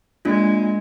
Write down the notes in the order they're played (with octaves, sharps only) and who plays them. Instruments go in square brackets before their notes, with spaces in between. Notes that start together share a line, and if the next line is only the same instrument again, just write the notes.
[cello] G#3 [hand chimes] A#3 D4 F4